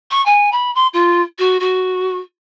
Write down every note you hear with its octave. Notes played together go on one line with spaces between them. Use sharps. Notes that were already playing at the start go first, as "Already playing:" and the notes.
C#6
G#5
B5
C6
F4
F#4
F#4